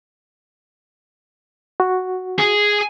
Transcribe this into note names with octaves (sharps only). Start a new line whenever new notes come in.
F#4
G#4